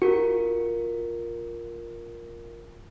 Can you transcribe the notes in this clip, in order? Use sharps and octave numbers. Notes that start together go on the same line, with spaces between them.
F4 F#4 A#4 C#7